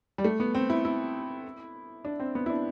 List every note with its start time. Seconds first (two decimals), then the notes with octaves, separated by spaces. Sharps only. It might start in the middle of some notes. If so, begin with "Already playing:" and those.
0.18 G3
0.24 A3
0.40 B3
0.55 C4
0.70 E4
0.85 E4
2.05 D4
2.20 C4
2.35 B3
2.46 E4
2.50 D4